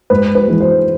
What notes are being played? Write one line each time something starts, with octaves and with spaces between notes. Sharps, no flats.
G#2 B4
B4
E3 G#3
C5